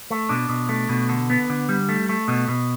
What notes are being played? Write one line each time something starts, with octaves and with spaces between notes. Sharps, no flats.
A3
B2 D4
B2
A3
B2
D3
B3
D3
G3
A3
A3
B2
B2